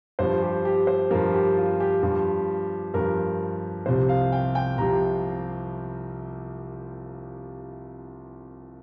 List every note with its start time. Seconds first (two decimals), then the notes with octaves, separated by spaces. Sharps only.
0.19 G2 F3 C5
0.42 G4
0.65 G4
0.87 C5
1.10 G2 F3 A#4
1.34 G4
1.57 F4
1.80 G4
2.03 G2 F3
2.94 G2 F3 A#4
3.86 C2 C3 F3 C5
4.09 F5
4.32 G5
4.55 G5
4.78 C2 C3 F3 A#5